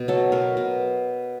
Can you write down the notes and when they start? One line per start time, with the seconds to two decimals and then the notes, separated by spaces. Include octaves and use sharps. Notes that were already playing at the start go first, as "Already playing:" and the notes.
Already playing: B2
0.08 F#3 A4
0.32 B2 A#4
0.57 B2